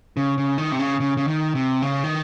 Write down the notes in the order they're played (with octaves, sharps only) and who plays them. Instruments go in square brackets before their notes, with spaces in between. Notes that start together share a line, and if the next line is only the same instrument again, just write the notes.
[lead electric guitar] C#3
C#3
D#3
C3
C#3
C#3
C#3
D#3
C3
C#3
D#3